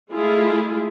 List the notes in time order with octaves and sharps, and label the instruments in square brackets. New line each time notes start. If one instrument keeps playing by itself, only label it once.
[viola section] G#3 A3 E4 F4 G#4